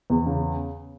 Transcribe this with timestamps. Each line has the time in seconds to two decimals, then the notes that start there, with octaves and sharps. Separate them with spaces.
0.10 E2
0.26 C#3